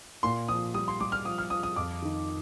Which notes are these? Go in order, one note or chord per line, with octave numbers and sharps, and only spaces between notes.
A#2 C6
F3 D#6
G3 D#6
C6
G3 D6
F6
F3 D#6
F6
F3 D#6
D#6
F2 D6
D#3